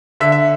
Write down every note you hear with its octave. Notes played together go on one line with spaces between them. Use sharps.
D3 E5
E5